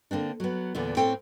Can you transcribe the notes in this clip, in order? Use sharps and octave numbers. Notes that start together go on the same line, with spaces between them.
D3 A#3 C4 D4
F#3 B3
E2 A#2 D3 B3
A2 C4 A4 C#5 G5